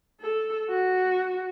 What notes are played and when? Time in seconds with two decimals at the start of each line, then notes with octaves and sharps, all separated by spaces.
0.21 A4
0.70 F#4